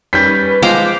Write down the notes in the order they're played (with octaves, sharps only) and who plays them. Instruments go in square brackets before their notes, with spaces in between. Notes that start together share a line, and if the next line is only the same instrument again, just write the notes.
[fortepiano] D#3 G3 C#4 [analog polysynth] B4 [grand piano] G6 B6
[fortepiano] F3 G#3 F4 [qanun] C5 F5 G5 [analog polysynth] D6